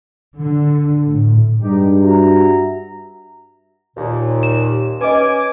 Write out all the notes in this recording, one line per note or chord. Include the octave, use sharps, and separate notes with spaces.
D3
A2
G2 G#3 D#4 G4
F#4 E5 A#5
D#2 A#2
E7
C#4 B4 D#5 G#5 D6